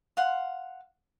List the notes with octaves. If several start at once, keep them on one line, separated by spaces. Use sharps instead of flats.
F5 F#5 C6